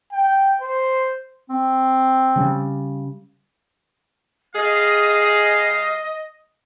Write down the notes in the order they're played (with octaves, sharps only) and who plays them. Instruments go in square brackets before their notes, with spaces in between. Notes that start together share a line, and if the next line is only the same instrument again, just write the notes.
[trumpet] G5
C5
[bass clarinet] C4
[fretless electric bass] C#3 G3
[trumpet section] G3 F5 [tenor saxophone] G#4 [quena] D#5